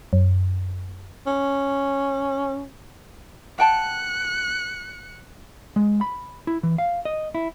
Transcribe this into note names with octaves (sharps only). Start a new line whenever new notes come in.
F#2
C#4
F#5 G5 A5 F#6 C#7
G#3
B5
E4
E3
F5
D#5
E4